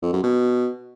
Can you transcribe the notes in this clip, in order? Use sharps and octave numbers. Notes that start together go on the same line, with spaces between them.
F2
F#2
B2